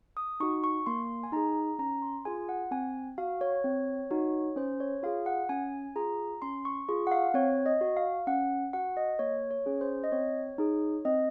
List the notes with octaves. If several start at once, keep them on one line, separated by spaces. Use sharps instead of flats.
D#6
D#4 F#4 C#6
C#6
A#3 C6
G#5
D#4 G#4 A#5
C#4 A#5
C6
F4 G#4 G#5
F#5
C4 G#5
F#4 F5
C#5
C4
D#4 F#4
C#4 C5
C#5
F4 G#4 F5
F#5
C#4 G#5
F4 G#4 A#5
C#4 C6
C#6
F4 G#4 C#6
F#5
F5
C4 C#5
D#5
F#4
F5
C#4 F#5
F#4 F#5
D#5
A#3 C#5
C#5
C#4 G#4
C5
D#5
C4 C#5
D#4 G#4
C4 D#5